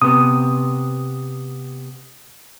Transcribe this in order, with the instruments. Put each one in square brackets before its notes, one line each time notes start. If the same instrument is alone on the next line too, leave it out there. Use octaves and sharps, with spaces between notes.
[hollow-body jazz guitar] C3 B3 [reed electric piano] D#6